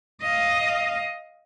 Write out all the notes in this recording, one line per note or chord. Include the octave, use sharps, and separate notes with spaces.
D#5 F5